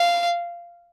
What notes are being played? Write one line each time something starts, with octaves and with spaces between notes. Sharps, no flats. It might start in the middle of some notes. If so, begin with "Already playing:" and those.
Already playing: F5